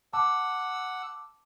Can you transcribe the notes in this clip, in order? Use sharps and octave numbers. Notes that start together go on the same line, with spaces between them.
F#5 A5 D6 E6